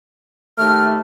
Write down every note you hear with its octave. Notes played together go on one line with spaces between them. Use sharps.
D#2 A3 F6